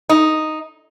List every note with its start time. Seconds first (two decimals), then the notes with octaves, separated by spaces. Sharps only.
0.09 D#4